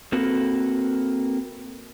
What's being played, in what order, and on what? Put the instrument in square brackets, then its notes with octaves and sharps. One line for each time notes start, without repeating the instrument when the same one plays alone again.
[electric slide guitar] A#3 C4 F#4 A4 B4